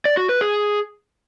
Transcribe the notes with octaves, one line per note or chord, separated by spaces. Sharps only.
D5
F#4
B4
G#4